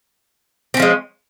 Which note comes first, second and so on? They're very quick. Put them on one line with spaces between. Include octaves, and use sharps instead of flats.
C4 C#4 F3 G#3